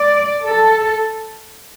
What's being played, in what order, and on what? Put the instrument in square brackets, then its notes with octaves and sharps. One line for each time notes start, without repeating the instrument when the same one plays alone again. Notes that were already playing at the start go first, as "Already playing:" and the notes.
Already playing: [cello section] D5
A4